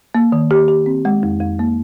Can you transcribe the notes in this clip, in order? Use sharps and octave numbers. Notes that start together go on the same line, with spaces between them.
A#3
D#3
G4
G4
C4
G#3
F2
F2
A#3